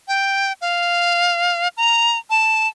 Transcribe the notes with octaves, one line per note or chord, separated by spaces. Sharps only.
G5
F5
A#5
A5